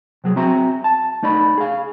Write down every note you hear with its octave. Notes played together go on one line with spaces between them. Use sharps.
C3 F#3 G#4
C4 F#4 E5 A#5
A5
A3 D#4 D5 B5
G#4 F5